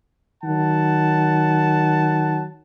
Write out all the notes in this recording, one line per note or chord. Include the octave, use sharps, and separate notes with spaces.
D#3 F#3 F#5 A5